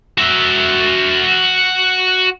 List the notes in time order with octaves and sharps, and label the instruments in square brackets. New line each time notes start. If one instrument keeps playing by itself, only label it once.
[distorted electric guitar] F#4 E5